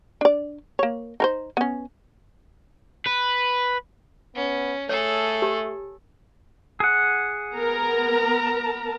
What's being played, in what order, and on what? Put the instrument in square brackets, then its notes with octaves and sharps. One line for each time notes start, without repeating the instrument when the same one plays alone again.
[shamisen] D4 D5
A#3 C#5
D#4 A#4 C5
B3 C#4
[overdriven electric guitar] B4
[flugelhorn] B3 [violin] C#4
[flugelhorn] A3 [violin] G#4 A4 [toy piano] C#5
[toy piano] G4
[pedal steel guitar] G#4 F#5
[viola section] B3 A#4 A#5